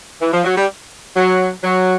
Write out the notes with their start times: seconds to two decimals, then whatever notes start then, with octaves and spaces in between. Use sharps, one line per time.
0.20 E3
0.32 F3
0.44 F#3
0.56 G3
1.16 F#3
1.63 F#3